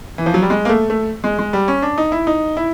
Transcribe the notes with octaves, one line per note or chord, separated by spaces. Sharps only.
E3
F3
F#3
G3
G#3
A#3
A3
A3
G#3
G#3
G3
C#4
D4
D#4
E4
D#4
E4